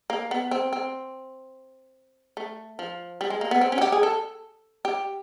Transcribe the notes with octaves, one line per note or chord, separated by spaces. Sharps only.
A#3
B3
C4
C4
A3
F3
G3
G#3
A#3
B3
C4
C#4
F#4
G4
G#4
A4
G4